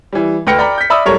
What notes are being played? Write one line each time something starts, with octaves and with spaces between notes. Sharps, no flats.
E3 G3
D2 B4 G5 F6 A#6 C#7
D5 G5 A#5 B5
G6 B6
D5 E5 B5 D#6 E6
D1 G3 A4 A#4 C#5